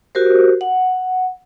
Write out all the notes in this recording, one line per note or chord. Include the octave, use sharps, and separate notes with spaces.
F#4 G4 A#4 C5
F#5